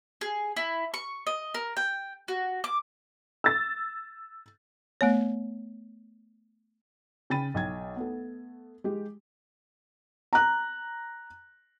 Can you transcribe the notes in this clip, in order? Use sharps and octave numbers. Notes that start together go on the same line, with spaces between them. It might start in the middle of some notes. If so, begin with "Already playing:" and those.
G#4
E4
C#6
D#5
A#4
G5
F#4
D6
E6 A6
A3 B3 C#5
C#3 G5 B5 A6 D#7
B1 G5 G#6
A3 B3
G#3 G4
A#5 F#6